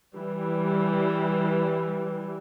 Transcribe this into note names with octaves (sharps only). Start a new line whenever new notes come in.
E3 G3